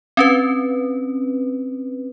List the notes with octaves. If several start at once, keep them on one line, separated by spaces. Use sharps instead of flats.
C4 C#4 B4